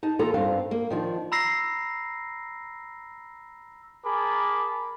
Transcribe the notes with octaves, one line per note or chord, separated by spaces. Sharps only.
D#4 A5
E3 A#3 F4 A4 A#5
G2 C4 D4 F5
A#3
D#3 F3 D4
A#5 B5 E6 A#6 C7
G#4 A#4 A5 B5 D6